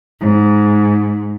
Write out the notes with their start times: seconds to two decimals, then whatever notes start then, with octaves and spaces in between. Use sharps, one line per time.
0.19 G#2